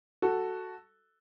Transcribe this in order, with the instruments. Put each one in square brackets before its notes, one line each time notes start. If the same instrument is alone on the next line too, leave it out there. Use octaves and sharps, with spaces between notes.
[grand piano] F#4 A4